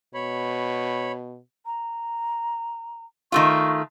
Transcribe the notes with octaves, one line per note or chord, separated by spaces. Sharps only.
B2 C#5 B5
A#5
D#3 A3 F4 C#6